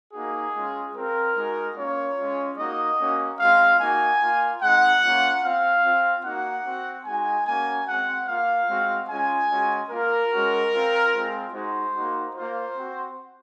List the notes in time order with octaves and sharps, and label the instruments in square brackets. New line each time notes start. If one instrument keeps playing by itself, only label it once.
[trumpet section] A#3 D#4 F#4 G#4
G#3 C#4 F4
C4 F4 A#4
G#3 D#4 F#4
A#3 C#4 F4 C#5
G#3 C#4 F4
A#3 D#4 F#4 D#5
A#3 C#4 F#4
G#3 C4 F4 F5
A#3 D#4 F#4 G#5
A#3 F4
G#3 C4 D#4 F#5
A#3 C#4 F4
C4 F4 F5
C4 F4
A#3 D#4 F#4 F#5
C4 F#4
G#3 D#4 F#4 G#5
A#3 C#4 F#4 G#5
G#3 C4 F#4 F#5
A#3 F4 F5
G#3 C4 F#4
G#3 C#4 F4 G#5
G#3 C#4 F#4
A#3 F4 A#4
G#3 C#4 F#4
C4 F4
G#3 C4 F4
G#3 D#4 F#4 C5
A#3 D#4 F#4
A#3 F4 C5
C4 F#4